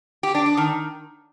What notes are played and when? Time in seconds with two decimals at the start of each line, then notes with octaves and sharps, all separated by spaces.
0.23 G4
0.35 D4
0.46 D4
0.57 D#3